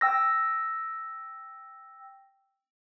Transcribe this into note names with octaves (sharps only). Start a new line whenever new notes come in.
G5 E6 A#6